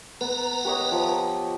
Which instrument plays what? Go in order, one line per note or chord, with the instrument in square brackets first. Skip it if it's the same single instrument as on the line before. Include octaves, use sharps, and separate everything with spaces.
[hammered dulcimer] B3 [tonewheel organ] B4 A#5
[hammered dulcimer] G4 [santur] A#4 C#5 D#5
[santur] F3